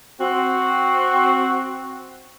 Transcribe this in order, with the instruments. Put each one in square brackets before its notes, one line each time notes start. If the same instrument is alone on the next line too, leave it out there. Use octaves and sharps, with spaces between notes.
[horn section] C4 F#4